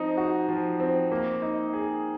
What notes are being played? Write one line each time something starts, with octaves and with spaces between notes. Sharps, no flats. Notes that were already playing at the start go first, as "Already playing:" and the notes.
Already playing: F3 C4 D#4
F#4
F3
C4
A#3
D#4
G#4